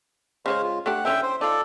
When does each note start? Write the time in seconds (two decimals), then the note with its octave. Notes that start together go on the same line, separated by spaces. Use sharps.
0.46 C#3 G#3 C5 C#5 F5
0.62 F4
0.86 A3 D4 G4 F#5
1.05 D3 C#4 E4 E5 G5
1.23 C5
1.41 D#4 F4 A4 D5